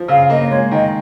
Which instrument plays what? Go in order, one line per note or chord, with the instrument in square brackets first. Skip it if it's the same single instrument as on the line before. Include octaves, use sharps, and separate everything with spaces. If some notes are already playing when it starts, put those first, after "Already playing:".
Already playing: [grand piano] F3
[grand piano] C#3 [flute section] F5
[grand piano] A#3 [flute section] D#5
[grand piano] G#3 [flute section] C#5
[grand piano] D#3 [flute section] D#5